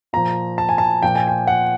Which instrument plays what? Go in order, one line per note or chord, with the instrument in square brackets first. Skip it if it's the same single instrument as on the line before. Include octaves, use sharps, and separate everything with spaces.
[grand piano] A#2 F3 A#5
A5
G#5
A5
A#2 F3 G5
G#5
G5
F#5